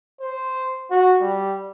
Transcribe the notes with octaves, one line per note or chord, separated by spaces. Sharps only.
C5
F#4
G3